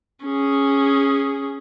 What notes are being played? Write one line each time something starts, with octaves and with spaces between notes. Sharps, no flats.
C#4 G#4